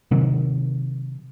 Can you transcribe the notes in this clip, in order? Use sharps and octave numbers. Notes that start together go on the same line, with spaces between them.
C3 D#3 F#3